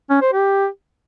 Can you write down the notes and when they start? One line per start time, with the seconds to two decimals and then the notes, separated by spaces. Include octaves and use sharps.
0.10 C#4
0.21 C5
0.33 G4